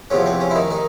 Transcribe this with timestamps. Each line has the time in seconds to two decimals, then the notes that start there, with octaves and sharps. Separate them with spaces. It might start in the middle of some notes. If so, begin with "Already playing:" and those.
0.10 E2 C3 F3 C#4
0.26 C4
0.40 C#4
0.50 E4
0.55 D#3 D#4
0.70 D#3 D#4